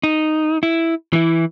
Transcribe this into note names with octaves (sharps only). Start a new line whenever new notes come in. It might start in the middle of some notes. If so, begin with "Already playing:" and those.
D#4
E4
E3 E4